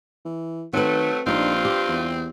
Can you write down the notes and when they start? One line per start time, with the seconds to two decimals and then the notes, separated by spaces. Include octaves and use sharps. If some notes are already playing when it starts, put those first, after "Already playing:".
0.25 E3
0.73 D#3 F#3 A3 C4 B4
1.27 A#1 G2 C4 D4 D#4 F4
1.65 G4
1.88 E2